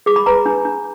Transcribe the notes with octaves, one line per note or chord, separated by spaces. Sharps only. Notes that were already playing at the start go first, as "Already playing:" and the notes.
G#4 D6
B5
B4 A#5
D4
D4